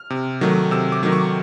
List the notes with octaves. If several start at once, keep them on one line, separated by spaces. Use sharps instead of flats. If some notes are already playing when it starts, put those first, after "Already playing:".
Already playing: F6
C3
D#3 F#3 A3
C3 E6
D6
D#3 F#3 A3
C#6